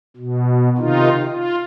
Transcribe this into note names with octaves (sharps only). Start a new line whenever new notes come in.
B2
C3 D#3 D#4 F4
F4